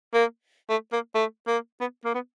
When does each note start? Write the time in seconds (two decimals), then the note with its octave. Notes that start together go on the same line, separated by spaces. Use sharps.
0.14 A#3
0.70 A3
0.92 A#3
1.15 A3
1.47 A#3
1.81 B3
2.05 A#3
2.14 B3